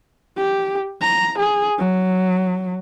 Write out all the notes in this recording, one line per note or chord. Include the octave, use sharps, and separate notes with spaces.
G4
A#5
G#4
F#3